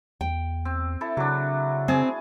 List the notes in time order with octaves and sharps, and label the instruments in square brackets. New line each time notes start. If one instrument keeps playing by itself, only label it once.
[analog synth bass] E2 [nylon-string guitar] G5
[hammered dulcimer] C4
E4 A4
[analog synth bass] C#3 [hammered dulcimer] F#3 D4
[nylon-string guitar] C4 [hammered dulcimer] G#4 G#5 A5